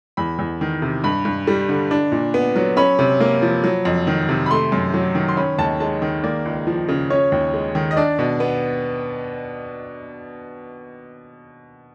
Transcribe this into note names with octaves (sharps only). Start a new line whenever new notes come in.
E2 B5
E2
D#3
C3
G2 B5
G2
G3
D3
D4
A#2
B3
F#3
C#4 B5
C3
A#3
F3
F#3
F2
D#3
C3
B5
A3 C6
F#2
F#3
D#3
C6
C#4 B5
D#2 A5
G#3 A5
D#3
A#3 D5
C#2
F3
C#3
C#4 C#5
D#2
G#3
D#3
D#5
D4 D5
B2
B3